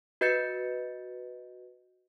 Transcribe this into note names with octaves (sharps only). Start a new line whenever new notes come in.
F#4 B4 D#5 G6 A6 C#7